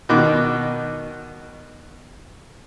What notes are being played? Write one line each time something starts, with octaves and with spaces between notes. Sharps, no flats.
B2 D#3 D6 F#6